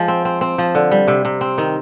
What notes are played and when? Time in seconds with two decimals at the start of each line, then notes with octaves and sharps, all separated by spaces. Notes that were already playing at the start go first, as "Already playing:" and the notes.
Already playing: F3 G#3
0.08 C4
0.25 C4
0.41 C4
0.58 F3
0.75 D3
0.91 G3
1.08 C3
1.25 C3
1.41 C4
1.58 D#3